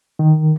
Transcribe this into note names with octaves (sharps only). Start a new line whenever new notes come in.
D#3